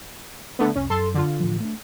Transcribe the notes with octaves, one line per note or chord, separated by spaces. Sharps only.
D3 A3 B3
F1 C2 C#4
F#2 A4 A5 C6
D3 F4
A2 E3 F3
A3 D4